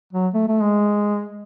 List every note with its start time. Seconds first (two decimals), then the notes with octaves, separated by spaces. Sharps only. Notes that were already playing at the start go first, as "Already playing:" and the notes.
0.13 F#3
0.34 A3
0.48 A3
0.61 G#3